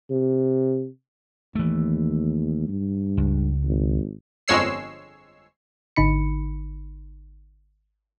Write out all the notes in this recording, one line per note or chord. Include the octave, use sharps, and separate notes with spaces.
C3
D#2 E3 A3
G2
C#2
G#1
G1 F2 G#3 C#5 E6 C7
G#1 D3 D#4 B5 C#7